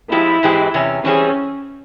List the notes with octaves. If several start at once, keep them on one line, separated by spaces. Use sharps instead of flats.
F3 G#3 C4 E4 G4
G#2 E3 G#3 C4 G4
E2 C3 C#4
E3 G3 C4 C#4 E4 G#4